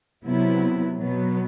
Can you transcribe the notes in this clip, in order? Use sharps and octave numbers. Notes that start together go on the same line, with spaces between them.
C3 F#3 B3 E4
B2 F#3 B3